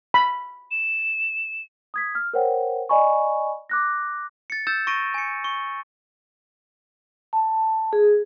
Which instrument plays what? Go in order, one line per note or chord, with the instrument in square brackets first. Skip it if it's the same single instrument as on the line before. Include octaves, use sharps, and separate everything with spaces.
[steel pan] B5
[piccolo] E7
[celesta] D#6 G#6 B6
F6
A#4 C5 C#5 F#5 G5
D5 D#5 G#5 B5 C#6
D6 F#6 A#6
[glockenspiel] A6 C#7
E6 G6 A6 E7
C#6 A#6 D7 D#7
G#5 C#7
C#6
[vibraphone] A5
G#4